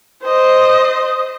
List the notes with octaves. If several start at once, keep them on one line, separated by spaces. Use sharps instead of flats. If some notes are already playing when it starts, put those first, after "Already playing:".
C5 D#5